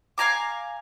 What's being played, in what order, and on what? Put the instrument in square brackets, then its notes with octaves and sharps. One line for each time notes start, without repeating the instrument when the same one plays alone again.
[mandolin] F5 G#5 A#5 D6